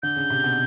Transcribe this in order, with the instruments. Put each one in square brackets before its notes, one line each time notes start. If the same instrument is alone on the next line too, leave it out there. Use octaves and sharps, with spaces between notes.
[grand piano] D3 [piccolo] G6
[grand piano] C#3
C3
B2